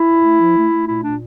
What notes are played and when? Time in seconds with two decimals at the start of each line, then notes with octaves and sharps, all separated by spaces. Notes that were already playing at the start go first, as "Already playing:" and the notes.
Already playing: E4
0.09 A#2
0.24 A3
0.40 F3
0.57 A3
0.72 A3
0.88 A#2 E4
1.04 A#2 D4